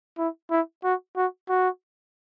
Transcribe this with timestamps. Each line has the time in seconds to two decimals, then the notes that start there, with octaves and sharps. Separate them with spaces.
0.18 E4
0.51 E4
0.84 F#4
1.17 F#4
1.49 F#4